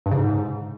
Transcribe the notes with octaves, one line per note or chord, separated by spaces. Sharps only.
G2
C#3
G#2